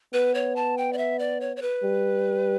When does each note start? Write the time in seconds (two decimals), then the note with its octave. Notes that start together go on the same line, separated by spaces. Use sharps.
0.13 B3 B4
0.35 C#5
0.56 A5
0.78 G5
0.93 D5
0.98 E5
1.19 D5
1.41 C#5
1.56 C#5
1.62 B4
1.83 G3